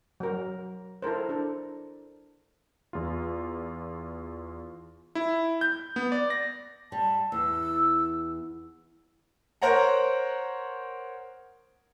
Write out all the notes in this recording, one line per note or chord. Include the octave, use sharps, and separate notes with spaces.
F#3 A#4
E4 A4 A#4 C5
D4 A4
E2 F4
E4
G6
B3
D5
A#6
G3 A5
E2 E6
A#4 C5 C#5 F#5 A#5